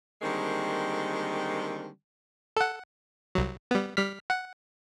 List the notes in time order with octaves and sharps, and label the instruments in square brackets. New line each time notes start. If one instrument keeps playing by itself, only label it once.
[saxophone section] D3 D#3 G3 G#3 A#3 C4
[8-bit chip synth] A4 F#5
C2 F#3
G3 B3
G3 F6 B6
F#5